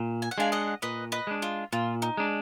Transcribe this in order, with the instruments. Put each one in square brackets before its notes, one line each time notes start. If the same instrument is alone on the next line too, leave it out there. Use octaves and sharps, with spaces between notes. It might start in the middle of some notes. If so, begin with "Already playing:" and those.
Already playing: [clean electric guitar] A#2
[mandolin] G#5
F#5
[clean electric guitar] G#3 D4 [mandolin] F5 G#5
[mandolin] D#5 F#5
[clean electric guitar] A#2 [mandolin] B4 D#5
[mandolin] B4 D#5
[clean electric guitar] G#3 D4
[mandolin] F4
[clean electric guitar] A#2 [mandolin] F4
[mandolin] D#4
[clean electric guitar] G#3 D4